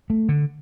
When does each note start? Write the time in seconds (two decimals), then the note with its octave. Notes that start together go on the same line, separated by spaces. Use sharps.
0.10 A3
0.29 D3